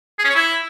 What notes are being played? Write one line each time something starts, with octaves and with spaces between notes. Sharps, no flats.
G#4
C#4
C#5
E4